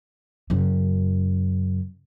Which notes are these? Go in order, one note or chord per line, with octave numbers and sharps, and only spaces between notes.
F#2 C#3